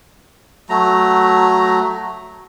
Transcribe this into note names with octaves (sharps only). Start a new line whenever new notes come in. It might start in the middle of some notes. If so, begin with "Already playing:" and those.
F#3 A3 A#5